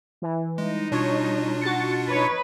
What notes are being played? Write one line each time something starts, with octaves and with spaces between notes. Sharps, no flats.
E3
G3 G#3 D#4
B2 D4 F4 C#5
F#4 A6 C#7
D#4 B4 C#5